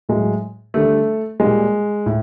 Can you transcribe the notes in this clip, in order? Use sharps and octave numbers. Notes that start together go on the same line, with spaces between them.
A2 F#3 G#3
D3 G3 A3
A#2 G3 G#3
A2